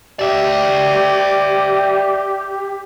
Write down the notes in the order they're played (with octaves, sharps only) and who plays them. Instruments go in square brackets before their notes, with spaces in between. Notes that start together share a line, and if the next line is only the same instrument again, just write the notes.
[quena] G4 [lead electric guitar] D5 E5